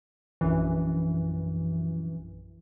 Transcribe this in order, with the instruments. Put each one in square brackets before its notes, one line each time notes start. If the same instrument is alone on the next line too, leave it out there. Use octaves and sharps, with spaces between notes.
[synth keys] A#1 F#2 E3